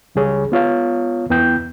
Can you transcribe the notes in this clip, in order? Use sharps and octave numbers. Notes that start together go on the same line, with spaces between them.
C#2 C#3 G3 G#4 C#5
B3 F4 C#5 F5
E2 B3 E4 G5 G6